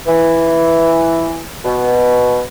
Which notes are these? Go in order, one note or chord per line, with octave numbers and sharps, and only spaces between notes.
E3
B2